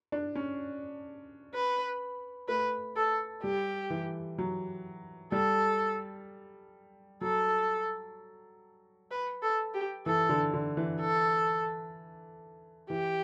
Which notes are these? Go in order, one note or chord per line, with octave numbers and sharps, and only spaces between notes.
D4
C#4
B4
A3 B4
A4
G3 G4
E3
F#3
G3 A4
F#3 A4
B4
A4
G4
E3 A4
D3
D3
E3
A4
E3 G4